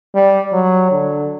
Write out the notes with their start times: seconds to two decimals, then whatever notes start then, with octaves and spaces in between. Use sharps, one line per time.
0.15 G3
0.53 F#3
0.92 D3